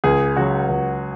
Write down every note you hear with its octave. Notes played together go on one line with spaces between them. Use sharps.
C#2 G#4
C#3 F#3 F#4
C#2